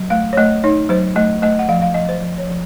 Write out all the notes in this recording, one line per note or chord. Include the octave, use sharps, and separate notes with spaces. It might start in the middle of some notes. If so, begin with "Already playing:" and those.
Already playing: F#3
A3 F5
C#5
A3 D#5
D#4 C#5
F#3 C5
A3 D#5
A3 D#5
F#5
F3 F5
F5
F3 D#5
C5
F3
C#5
F3